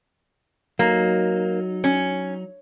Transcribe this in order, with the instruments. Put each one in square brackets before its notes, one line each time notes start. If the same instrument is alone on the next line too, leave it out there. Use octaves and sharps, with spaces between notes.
[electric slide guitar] F#3 D#4 [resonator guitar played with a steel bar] A#3
[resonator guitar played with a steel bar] C#4